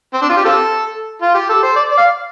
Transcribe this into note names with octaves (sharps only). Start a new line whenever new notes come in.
C4
D4
F4
G4
C4 F4 A4
F4
G4
A4
C5
D5
D5
F5